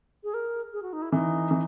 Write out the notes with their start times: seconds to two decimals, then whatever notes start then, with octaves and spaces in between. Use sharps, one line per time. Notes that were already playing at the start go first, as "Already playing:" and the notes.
0.24 G#4
0.34 A#4
0.73 G#4
0.83 F#4
0.93 D#4
1.02 E4
1.12 E3 D#4
1.51 E3